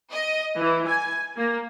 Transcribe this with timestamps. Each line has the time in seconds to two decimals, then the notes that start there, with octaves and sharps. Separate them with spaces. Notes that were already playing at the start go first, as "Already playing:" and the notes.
0.12 D#5
0.58 E3
0.87 G#5
1.36 A#3